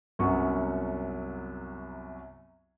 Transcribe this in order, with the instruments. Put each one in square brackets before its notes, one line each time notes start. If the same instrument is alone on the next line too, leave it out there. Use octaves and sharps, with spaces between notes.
[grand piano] C2 F#2 F#3 B3 C#6